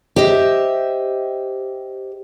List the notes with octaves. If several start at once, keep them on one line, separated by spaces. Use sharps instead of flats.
G4 C5 D#5 E5